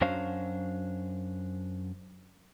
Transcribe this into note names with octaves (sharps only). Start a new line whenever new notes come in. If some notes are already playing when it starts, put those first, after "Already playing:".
F#2 F#3 C#4 D4 C5 F5